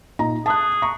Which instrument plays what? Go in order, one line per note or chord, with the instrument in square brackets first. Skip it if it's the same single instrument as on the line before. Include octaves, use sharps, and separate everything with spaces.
[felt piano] A#2 D#4 A#5
[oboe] G#4 [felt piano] A5 D#6 F#6
[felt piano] A#5 C#6